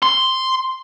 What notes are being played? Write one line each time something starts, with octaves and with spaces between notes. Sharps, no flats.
C6